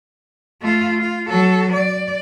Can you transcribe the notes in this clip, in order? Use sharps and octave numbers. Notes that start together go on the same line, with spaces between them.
A3 F4
F4
F#3 A4
D5